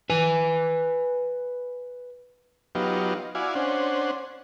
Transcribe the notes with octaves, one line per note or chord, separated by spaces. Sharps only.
B4 G#5
F#3 B3 D#4 F4 G4
E4 F#4 D5 F5 G#5
C#4 D4 C5 F#5